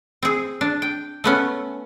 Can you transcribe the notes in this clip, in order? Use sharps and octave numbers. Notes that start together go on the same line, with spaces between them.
C4 G#4
D4
G5
A3 B3 C#4